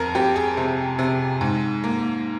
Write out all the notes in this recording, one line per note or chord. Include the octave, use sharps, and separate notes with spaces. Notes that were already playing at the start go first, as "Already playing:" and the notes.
Already playing: F2 A#4
F2 G4
G#4
C3
C3
G#2
A#3